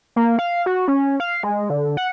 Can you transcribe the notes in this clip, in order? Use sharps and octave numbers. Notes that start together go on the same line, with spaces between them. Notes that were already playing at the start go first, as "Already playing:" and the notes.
A#3
F5
F#4
C#4
F5
G#3
D3
F#5